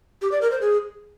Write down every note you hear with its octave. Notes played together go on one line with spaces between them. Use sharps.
G4
D5
A#4
C5
G#4